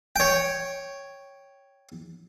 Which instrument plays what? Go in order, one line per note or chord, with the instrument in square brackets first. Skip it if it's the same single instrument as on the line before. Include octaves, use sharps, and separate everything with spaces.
[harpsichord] C#5 G5